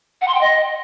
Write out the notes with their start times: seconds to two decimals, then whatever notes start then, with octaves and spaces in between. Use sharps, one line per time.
0.21 F#5
0.28 C6
0.34 G5
0.41 D#5